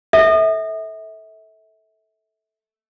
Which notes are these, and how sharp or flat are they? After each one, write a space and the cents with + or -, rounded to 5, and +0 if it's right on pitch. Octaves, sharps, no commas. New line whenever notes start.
A4 +0 E5 -30